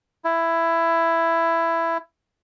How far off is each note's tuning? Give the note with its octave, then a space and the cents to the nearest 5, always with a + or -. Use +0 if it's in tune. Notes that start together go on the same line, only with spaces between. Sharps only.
E4 +10